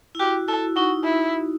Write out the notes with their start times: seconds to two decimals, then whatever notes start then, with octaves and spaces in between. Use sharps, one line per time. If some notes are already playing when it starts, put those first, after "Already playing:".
0.15 E4
0.19 F#4 G4
0.48 E4 A4
0.76 D#4 F#4
1.04 E4